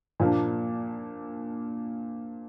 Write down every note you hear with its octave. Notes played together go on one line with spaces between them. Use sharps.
A#2 F3 A#3 D4